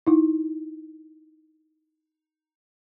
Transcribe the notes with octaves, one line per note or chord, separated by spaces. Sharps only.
D#4 E4